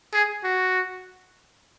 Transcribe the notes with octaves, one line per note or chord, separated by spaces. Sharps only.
G#4
F#4